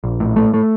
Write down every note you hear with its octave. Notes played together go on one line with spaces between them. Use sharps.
A#1
A2
A3
A3